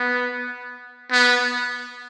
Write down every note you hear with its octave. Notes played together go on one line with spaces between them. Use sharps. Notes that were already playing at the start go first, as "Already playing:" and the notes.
Already playing: B3
B3